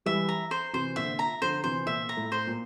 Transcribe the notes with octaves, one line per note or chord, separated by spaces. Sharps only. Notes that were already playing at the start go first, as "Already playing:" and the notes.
E3 G3 E5
A#5
C5
C3 E3 C5
A#2 D3 E5
A#5
D3 F3 C5
C3 E3 C5
A#2 E5
A#5
A2
C5
A#2